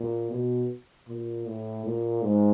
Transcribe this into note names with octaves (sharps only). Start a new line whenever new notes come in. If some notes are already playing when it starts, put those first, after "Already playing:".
Already playing: A#2
B2
A#2
A2
A#2
G#2